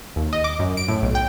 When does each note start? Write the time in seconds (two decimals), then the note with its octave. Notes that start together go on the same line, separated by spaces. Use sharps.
0.16 D#2
0.33 D#5
0.44 D6
0.59 F#2
0.77 D7
0.88 A2
1.03 B1
1.15 G5